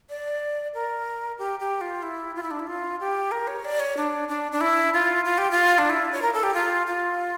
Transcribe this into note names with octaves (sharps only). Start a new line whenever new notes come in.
D5
A#4
G4
G4
F4
E4
F4
E4
D4
E4
F4
G4
A#4
C#5
D5
C#5
D4
D4
D4
E4
F4
F4
G4
F4
D4
E4
C#5
A#4
A4
G4
F4
F4